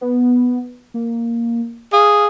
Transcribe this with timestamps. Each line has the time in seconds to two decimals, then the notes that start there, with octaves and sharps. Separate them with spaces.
0.01 B3
0.94 A#3
1.93 G#4 F5